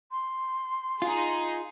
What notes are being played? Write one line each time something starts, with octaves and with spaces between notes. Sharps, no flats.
C6
D#4 F4 G#4